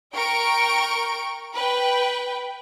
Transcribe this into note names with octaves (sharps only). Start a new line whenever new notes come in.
A#4 G5 C#6 D7
B4 G5